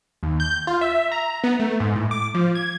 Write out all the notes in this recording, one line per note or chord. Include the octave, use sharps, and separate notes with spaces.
D#2
G6
F4
E5
A#5
B3
A3
G#2
A2
D6
F3
G#6